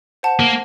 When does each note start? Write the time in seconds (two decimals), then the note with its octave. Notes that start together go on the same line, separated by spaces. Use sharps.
0.23 C5 F#5 A5
0.40 A#3